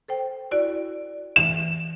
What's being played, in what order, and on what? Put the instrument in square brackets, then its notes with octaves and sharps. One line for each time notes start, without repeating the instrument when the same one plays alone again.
[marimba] A4 C5 G5
E4 F#4 D5
[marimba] E3 [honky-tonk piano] E7